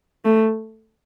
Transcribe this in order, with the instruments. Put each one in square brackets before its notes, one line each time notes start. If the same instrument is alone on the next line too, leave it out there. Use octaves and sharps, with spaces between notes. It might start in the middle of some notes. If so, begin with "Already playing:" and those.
[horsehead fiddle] A3